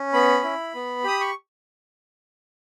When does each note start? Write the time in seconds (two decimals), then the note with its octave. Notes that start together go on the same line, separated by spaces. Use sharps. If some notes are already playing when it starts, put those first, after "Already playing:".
Already playing: C#4
0.13 B3 B5
0.43 E4
0.75 B3
1.04 G4 D#6
1.21 C#6